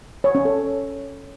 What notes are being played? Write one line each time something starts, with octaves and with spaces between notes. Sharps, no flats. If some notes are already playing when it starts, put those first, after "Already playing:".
C#5
C#4
A4